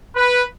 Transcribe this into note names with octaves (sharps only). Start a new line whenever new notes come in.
B4